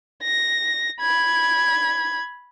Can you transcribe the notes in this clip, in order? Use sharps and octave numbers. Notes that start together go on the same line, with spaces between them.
A#6
B5 G#6